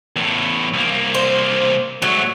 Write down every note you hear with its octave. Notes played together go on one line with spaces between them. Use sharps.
E2 A2
C2 A#3
C5
G#2 F#3 A3